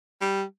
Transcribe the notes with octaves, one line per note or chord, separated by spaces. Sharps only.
G3